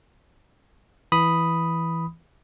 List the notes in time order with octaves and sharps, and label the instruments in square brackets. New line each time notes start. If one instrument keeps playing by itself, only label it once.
[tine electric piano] E3 B5 D#6